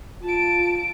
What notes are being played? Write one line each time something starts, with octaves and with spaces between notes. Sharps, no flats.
F4 A5 D7